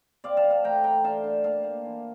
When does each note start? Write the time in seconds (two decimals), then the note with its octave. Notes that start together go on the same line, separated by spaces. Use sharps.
0.24 C4 D5 F5
0.37 F5 A5
0.44 E3
0.50 F5 A5
0.64 A3 G5 A#5
0.84 E3 G5 A#5
1.04 D3 F5 A5
1.24 D3
1.44 A#3 F5 A5
1.64 A#3
1.85 E3